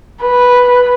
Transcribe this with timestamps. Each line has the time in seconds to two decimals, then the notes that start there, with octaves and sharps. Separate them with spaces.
0.21 B4